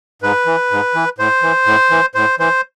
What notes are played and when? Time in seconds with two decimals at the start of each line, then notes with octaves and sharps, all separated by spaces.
0.22 G#2 B4
0.46 E3
0.71 G#2
0.94 E3
1.18 A2 C5
1.42 E3
1.66 A2
1.90 E3
2.15 A2 C5
2.39 E3 C5